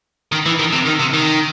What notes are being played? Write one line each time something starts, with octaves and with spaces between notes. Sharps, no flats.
D#3
E3
D#3
C3
D#3
C3
D#3